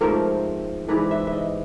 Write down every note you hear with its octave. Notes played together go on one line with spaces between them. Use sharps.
G#2 F3 A3 C4 A#4
G#2 E3 G3 B4
E5
E5
D#5